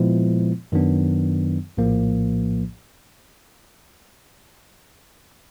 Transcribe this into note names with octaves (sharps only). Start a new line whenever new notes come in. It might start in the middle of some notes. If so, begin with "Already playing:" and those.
Already playing: A#2 F3 G#3 B3 E4
F#2 D#3 F#3 B3 D4
A#1 A2 F3 A#3